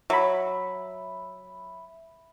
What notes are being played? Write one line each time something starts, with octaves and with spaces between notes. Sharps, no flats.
F#3 E5 B5